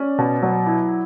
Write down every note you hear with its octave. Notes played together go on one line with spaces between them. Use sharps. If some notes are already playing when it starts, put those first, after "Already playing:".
Already playing: C#4 D5
B2
F#3
E4